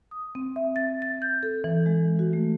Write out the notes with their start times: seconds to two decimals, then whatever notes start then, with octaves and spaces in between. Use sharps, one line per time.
0.11 D#6
0.35 C4
0.56 E5
0.76 A6
1.02 A6
1.22 G6
1.43 A4
1.64 E3
1.86 G#3
2.19 F#4
2.33 A3